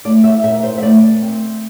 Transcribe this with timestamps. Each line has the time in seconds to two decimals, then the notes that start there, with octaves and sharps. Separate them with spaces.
0.05 A3 D5
0.24 E5
0.44 A#2 E5
0.63 C5
0.78 E5
0.82 A3 D5
1.22 C4